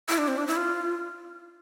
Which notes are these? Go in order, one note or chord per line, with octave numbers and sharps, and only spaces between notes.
E4
D4
C4
D4
E4
F4